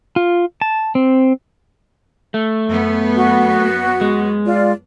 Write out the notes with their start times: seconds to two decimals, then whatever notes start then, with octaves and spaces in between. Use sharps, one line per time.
0.16 F4
0.61 A5
0.95 C4
2.34 A3
2.67 F#2 B3
3.15 F#4
4.01 G#3
4.46 F4 D5